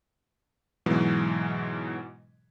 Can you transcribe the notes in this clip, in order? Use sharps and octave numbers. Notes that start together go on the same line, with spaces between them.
G#2 B2 E3 F#3 G#3